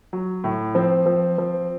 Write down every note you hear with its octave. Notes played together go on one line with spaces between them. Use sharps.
F#3
A2
F3 C4
F3
F3